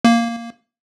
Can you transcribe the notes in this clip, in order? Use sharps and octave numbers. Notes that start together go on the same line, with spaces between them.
A#3